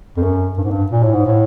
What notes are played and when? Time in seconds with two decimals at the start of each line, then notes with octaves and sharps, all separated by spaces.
0.17 F2
0.23 F#2
0.58 G2
0.64 G#2
0.71 G2
0.92 A#2
1.03 A2
1.14 G#2
1.26 A2